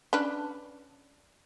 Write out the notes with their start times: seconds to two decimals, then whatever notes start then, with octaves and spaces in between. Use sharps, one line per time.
0.13 C#4 D4 B4